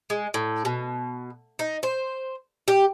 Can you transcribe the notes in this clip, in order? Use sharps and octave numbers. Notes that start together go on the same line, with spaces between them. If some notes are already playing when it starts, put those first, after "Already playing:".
G#3
A2
B2
D#4
C5
G4